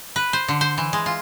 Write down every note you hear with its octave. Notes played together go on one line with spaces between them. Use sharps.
B4
C5
D3
C5
E3
G#3
F4